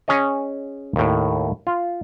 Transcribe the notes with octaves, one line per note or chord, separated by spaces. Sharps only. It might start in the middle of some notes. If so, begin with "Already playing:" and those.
C#4 G#4 C#5 D#5
D#2 A2
F4